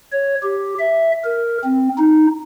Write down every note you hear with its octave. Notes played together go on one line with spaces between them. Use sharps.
C#5
G4
E5
A#4
C4
D#4